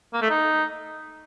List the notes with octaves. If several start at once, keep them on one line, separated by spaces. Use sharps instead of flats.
A#3
A3
D#4